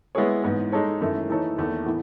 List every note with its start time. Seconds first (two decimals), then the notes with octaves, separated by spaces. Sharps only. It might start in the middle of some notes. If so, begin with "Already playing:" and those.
0.15 G#3 B3 E4 G#4 C#5
0.44 G#2 E3 B3
0.72 G#3 D#4 A4 C#5
1.01 F#2 D#3 A3 E4
1.29 E3 A3 D#4 A4 C#5
1.58 E2 D#3 A3
1.86 A2 E3 B3